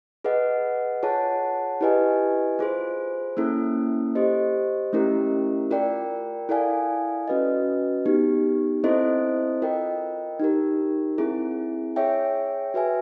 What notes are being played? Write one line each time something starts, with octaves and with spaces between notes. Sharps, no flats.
G#4 B4 D#5 F#5
F4 G#4 C#5 F#5 A5
E4 G4 B4 D#5 G#5
F4 G#4 C5
A#3 C#4 E4 A4
G4 C5 D#5
A3 C#4 E4 G4 A#4
F4 A#4 D5 G5
E4 A4 D5 F5 G#5
C#4 F#4 B4 D#5
B3 D#4 G4
C4 E4 A4 C5 D#5
F4 A#4 D#5 G5
D#4 G4 A#4
C4 E4 G#4
G#4 C#5 E5 G5
F#4 B4 E5 G#5